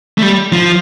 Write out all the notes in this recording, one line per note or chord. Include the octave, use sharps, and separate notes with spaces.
A3
G3
F3